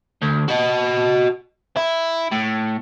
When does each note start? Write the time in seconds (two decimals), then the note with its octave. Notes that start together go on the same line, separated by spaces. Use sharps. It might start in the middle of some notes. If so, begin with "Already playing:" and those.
0.22 D2
0.48 F#4 D#5
1.77 E4
2.32 A2